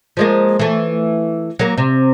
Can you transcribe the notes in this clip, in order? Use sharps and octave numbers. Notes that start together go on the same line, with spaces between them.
F3 G#3 A#3
E3 A3
F#3 A#3
C3